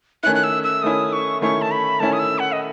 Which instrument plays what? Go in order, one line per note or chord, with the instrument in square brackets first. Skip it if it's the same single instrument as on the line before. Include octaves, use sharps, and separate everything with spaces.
[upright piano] D#3 A3 C#4 E4 [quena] F#6
[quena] F#6
E6
E6
[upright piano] D#3 A3 C#4 E4 [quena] D#6
[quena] C#6
[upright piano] D#3 A3 C#4 E4 [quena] C#6
[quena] A5
B5
[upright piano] D#3 A3 C#4 E4 [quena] A5
[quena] D#6
E6
F#5
D#5